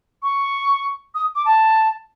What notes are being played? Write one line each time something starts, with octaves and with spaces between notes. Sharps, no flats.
C#6
D#6
D6
A5